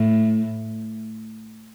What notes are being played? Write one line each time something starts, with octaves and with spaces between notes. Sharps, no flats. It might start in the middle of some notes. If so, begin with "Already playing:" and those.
Already playing: A2